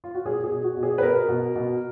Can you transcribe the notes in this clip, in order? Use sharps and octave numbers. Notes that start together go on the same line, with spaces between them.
F4
F#4
B2 G#4
G#4
B2
F#4
B2
G#4
B4
B2 A#4
B2
B2